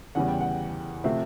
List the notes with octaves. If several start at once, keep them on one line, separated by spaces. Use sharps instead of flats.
E2 C#3 E3 G3 F#5
G5
F#5
C3 F3 A3 C4 E5